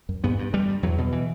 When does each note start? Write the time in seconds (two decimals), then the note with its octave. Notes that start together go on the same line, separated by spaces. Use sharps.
0.09 F#2
0.24 G2 B3
0.39 G2
0.53 G2 G3
0.68 G2
0.83 E2 F#3
0.98 B2
1.12 E3